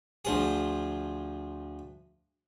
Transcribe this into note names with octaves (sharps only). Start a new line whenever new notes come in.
D2 F3 G#4